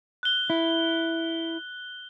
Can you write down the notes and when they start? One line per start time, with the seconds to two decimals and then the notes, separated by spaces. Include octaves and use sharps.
0.23 F#6 G7
0.50 E4